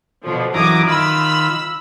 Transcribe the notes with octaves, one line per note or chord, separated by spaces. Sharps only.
B2 D3 F3
F#2 E3 A#5 D6 D#6 G#6
D#3 F4 B5 E6